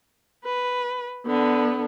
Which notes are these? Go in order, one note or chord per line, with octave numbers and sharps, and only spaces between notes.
B4
D3 B3